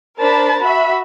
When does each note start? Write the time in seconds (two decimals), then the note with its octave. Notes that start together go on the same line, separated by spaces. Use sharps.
0.20 D4 A#4 C5 A5 B5
0.63 F#4 E5 B5